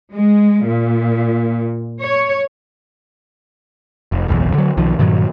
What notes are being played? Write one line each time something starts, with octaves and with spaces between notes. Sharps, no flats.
G#3
A#2
C#5
F1
F#1 B1 E2
D3 F#3
B1 D#3 F3
G2 A#2 D#3 F#3